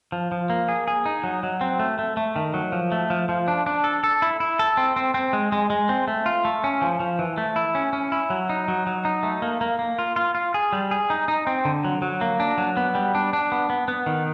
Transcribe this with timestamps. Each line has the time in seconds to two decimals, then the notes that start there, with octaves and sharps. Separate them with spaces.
0.12 F3
0.32 F3
0.50 A#3
0.69 G#4
0.88 G#4
1.06 D#4
1.24 F#3
1.43 F#3
1.61 C4
1.79 A3
1.99 A3
2.17 A3
2.36 D#3
2.54 F#3
2.72 F3
2.92 A3
3.10 F3
3.29 F3
3.48 D4
3.66 D4
3.84 A4
4.04 A4
4.22 E4
4.40 E4
4.59 A4
4.77 C4
4.96 C4
5.14 C4
5.33 G#3
5.52 G#3
5.70 G#3
5.89 C4
6.08 A3
6.26 F4
6.45 A3
6.64 C#4
6.82 F3
7.00 F3
7.19 E3
7.38 A3
7.56 E4
7.75 C#4
7.93 C#4
8.12 E4
8.30 F#3
8.49 D#4
8.68 F#3
8.87 F#3
9.05 D#4
9.23 A3
9.42 A#3
9.61 A#3
9.79 A#3
9.99 F4
10.16 F4
10.35 F4
10.54 G#4
10.73 G3
10.91 G#4
11.10 D#4
11.28 D#4
11.47 C4
11.65 D3
11.85 F#3
12.02 F#3
12.21 A#3
12.40 D4
12.58 F#3
12.77 B3
12.95 G3
13.15 D4
13.33 D4
13.52 B3
13.70 B3
13.88 B3
14.06 D#3